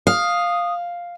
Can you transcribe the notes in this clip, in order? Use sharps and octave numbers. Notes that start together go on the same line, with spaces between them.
F5 D#6